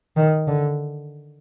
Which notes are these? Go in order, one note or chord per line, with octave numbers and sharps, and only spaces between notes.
D#3
D3